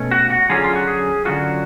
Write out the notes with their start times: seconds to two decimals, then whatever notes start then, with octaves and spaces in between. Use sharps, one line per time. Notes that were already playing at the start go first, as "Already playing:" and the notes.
Already playing: B2 A3 C#4
0.11 F#4
0.30 F#4
0.49 D3 F#3 C#4 F4 G#4
0.64 F4
0.76 F#4
0.87 G#4
1.25 D3 F#3 C#4 F4 F#4